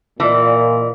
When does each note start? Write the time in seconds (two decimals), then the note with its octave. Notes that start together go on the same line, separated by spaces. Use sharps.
0.20 A#2 E3 D5 D#5 F#5